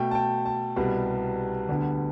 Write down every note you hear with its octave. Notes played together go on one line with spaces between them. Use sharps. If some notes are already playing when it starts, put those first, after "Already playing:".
Already playing: B2 A3 G5
A5
G5
A5
C2 B2 G3 B3
D2 D3 G3 B3